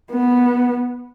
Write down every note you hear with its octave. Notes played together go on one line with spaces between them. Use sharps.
B3